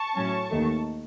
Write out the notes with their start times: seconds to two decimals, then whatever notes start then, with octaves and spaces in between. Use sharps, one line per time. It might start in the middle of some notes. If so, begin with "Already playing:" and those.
Already playing: A5 C#6
0.14 A2 F#3 C#4
0.49 D#2 D#3 A3